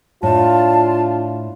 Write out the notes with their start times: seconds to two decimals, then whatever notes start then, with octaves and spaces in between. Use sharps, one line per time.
0.23 A2 D4 F4 A5